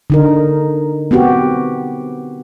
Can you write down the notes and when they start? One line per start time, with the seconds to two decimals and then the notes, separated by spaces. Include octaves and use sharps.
0.10 D3 D#4 A#4
1.11 B3 C4 F#4 G4